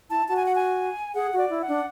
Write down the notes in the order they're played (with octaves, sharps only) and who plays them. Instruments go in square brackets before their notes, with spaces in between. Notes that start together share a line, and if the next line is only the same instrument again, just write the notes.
[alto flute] E4 [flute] A5
[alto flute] F#4 [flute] A5
[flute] G#5
F#5
G#5
[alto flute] G#4 [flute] F#5
[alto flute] F#4 [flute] D5
[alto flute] E4
[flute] F#5
[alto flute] D4